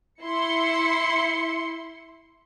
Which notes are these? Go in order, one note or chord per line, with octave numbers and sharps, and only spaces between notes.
E4 C6 C#7